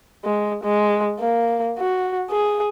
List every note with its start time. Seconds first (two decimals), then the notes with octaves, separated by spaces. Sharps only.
0.24 G#3
0.63 G#3
1.20 A#3
1.78 F#4
2.31 G#4